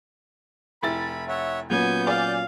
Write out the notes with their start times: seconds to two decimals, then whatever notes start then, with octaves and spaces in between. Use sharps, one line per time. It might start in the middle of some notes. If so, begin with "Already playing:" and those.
0.83 F1 E4 B5 A6
1.28 C#5 E5 F#5
1.70 A#2 F#3 B3 C#4 G#5 G6
2.07 D5 F5 G#5